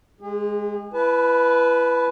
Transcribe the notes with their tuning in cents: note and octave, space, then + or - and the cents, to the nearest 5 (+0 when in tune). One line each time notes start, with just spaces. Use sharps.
G#3 +0 G#4 -40
E4 +30 B4 +0 A5 -40